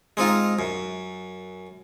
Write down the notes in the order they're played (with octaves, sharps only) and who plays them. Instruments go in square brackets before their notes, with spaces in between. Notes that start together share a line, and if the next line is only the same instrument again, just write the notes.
[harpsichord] G#3 C4 D#4 F4
F#2